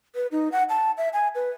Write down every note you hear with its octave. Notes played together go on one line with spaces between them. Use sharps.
B4
D#4
F#5
A5
E5
G#5
B4